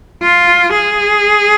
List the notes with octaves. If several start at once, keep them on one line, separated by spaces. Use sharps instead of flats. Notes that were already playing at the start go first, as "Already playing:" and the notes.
F4
G#4